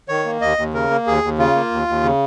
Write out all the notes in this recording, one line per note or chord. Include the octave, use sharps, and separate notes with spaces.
D#3 C#5
A#3
D#2 D#5
D#2
C#3 A#4
A#3
D#2 G#4
D#2
C#3 F4
A#3
D#2
D#2
C#3